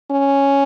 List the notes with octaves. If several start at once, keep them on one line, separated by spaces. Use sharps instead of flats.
C#4